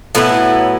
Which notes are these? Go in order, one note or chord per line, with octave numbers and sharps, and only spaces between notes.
A2 F#3 B3 E4